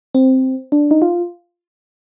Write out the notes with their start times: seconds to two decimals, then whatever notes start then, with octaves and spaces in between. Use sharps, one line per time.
0.15 C4
0.72 D4
0.91 D#4
1.02 F4